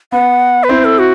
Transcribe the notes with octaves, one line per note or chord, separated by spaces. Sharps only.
B3 F#5
B4
C4 E4 C5
A4
F#4